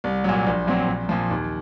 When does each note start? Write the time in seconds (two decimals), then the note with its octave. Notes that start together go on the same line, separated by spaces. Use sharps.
0.04 C2
0.24 A#2 F#3
0.47 A#1
0.67 A#2 F#3 C4
0.88 A#1
1.09 A#2 F3
1.31 D#2